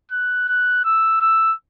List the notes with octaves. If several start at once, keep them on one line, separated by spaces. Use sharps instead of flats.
F#6
F#6
E6
E6